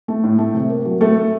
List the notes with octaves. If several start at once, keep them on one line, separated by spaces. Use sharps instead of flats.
A3
A2
A3
C3
A#3
F#3
A3 A4
A3